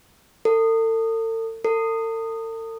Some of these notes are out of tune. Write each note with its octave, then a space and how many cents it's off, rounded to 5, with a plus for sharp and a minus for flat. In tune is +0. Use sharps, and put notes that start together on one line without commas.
A4 +40
A4 +45